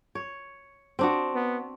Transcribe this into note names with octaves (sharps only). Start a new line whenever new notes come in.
C#5
C4 D4 F#4
B3